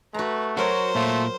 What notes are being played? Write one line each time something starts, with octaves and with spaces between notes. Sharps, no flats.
A3 F#4 B4 A#5
F#3 F#4 A#4 C5 C#5
A#2 A3 F4